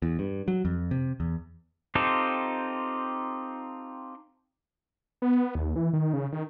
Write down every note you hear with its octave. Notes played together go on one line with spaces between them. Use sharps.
E2
G2
F#3
F2
C3
E2
C4 D#4 F4 G4 A4
B3
D#2
E3
D#3
C#3
D#3